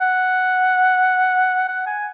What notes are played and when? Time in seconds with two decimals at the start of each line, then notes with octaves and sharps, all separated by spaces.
0.01 F#5
1.68 F#5
1.86 G#5